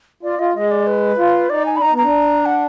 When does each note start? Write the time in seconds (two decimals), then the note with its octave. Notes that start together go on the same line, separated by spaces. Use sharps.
0.23 F4 D5
0.39 F4 D#5
0.55 G#3 D#5
0.71 D5
0.87 B4
1.18 F4
1.50 D#4 D5
1.66 G#5
1.76 D4 B5
1.82 D#4 A#5
1.93 B3
1.98 A#5
2.03 D4
2.46 F#5